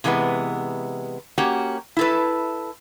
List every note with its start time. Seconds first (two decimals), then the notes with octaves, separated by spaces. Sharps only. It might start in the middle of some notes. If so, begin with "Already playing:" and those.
0.04 C3 E3 G#3 A3 B3
1.38 A#3 C#4 F#4 G4
1.97 E4 A4 B4